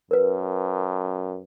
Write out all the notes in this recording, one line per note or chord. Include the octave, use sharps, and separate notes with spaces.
F#2 A#4 B4